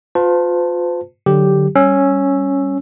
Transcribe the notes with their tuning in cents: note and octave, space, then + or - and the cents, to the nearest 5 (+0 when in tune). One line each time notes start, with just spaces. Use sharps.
F4 +25 C5 -45 A5 +5
D3 +0 F#3 +0 G4 +0
G3 +0 C#4 -5 E6 +5